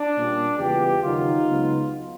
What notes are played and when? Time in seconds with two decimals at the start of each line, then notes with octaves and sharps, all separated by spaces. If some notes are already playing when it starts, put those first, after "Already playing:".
Already playing: D4
0.15 A#2 G3 A#3 C#4
0.58 E2 C#3 E3 G3 B3 F4 G4
1.01 D#2 C#3 F#3 A#3 D#4 F4
1.46 C#2 C#3 F#3 B3